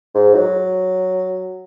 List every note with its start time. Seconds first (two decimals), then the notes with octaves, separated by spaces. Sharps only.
0.15 G#2
0.35 F#3